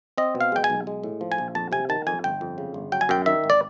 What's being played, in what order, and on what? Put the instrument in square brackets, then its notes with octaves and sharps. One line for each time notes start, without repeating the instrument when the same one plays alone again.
[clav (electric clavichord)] C4 D#5
B2
F5
G#3 G5
G#5
B1
G#3
A2
F3
G#5
A#1
F2 A5
C3 G#5
D#3 A5
F2 G#5
G1 G5
F2
C#3
G1
F#3 G5
G#5
F#2 G5
D#3 E5
G#1
D5